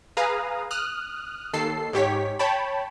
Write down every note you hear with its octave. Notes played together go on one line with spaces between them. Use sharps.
G#4 B4 F5 A#5 D#6
D#6 F6 F#6
D#2 A4 C7
G#2 G4 C#5 B6
C#5 G5 A5 B5